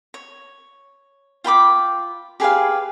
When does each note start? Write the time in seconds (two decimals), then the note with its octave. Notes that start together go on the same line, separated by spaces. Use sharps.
0.14 C#5
1.44 F4 G5 B5 D6
2.40 G4 G#4 B4 F5